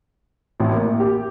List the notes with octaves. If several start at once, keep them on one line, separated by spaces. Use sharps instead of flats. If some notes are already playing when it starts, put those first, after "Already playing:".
A1
A#3
G4